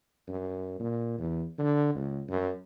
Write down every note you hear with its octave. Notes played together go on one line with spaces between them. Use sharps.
F#2
A#2
E2
D3
C#2
F#2